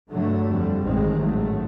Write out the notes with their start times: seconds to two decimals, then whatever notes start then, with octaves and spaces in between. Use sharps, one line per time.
0.10 G2 D3 F#3 A3
0.47 F2 D3 G3
0.83 A1 G2 D#3 G#3 C4
1.20 G#2 D#3 F#3 A3